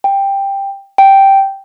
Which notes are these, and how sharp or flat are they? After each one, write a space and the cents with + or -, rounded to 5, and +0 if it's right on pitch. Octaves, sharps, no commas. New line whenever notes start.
G5 +10
G5 -5